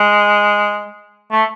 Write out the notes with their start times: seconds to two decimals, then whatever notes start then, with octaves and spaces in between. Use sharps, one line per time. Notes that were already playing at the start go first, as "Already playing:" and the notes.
Already playing: G#3
1.32 A3